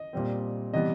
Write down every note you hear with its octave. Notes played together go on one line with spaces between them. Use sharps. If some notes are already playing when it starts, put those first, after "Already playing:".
Already playing: D#5
A#2 G3 C4
C3 E3 G3 B3 D#5